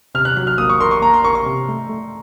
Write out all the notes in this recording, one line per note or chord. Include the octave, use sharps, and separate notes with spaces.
C3 F6
F#6
F#3 F#6
F6
A#3 D#6
C#6
A#4 C6
C#6
A#3 A#5
C6
A#4 C#6
C#6
C3
A3
A3